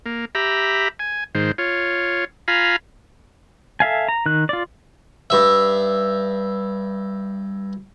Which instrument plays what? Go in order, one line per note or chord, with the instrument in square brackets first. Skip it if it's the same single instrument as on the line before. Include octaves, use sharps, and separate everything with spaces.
[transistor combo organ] A#3
G4 E5 A#5 B5
G#5
G#2 D#3 C5
F4 C#5
F4 F5 G#5 A#5 B5
[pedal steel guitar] A4 E5 F5 G#5
A#5
D#3 F#6
F4 D5
[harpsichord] G2 E5